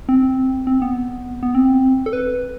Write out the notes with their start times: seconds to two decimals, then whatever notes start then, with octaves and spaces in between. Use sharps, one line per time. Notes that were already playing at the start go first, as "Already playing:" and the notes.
0.09 C4
0.67 C4
0.82 B3
1.43 B3
1.55 C4
2.06 A4
2.13 B4